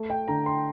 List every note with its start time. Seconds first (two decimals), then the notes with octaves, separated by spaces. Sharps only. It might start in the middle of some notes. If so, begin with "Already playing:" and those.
Already playing: A3
0.10 G5
0.28 D3 A#5
0.46 C6